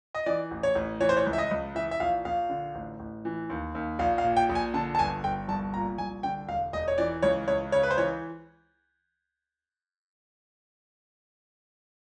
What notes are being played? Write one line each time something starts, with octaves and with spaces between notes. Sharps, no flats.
D#5
E3 D5
A1
C#5
A1
E3 C#5
C5
C#5
C#2
E5
D#5
C#2
E3 E5
E5
A#1 F5
A#1 F5
D3
A1
A1
E3
D#2
D#2
A#1 F5
F5
A#2
G5
A#1
G#5
D3 A5
A5
G1 G#5
G1 G5
C2 A5
A#2 A#5
C2 G#5
D3 G5
E1 F5
E1 D#5
C#5
E3 D5
C#2 C#5
C#2 C#5
C#3 C#5
B4
C5
E3 C#5